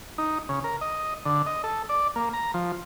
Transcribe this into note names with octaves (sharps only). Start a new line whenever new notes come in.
D#4
C#3
A#4
D#5
D3
D#5
A4
D5
A#3
A#5
F3